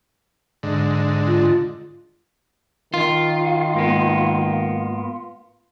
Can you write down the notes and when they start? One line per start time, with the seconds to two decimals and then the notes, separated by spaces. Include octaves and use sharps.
0.63 G#2 D3
1.26 F4
2.94 D#3 F4
3.75 G#2 A#3 B3